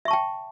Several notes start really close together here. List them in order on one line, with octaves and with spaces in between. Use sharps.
E5 C#6 A5 G5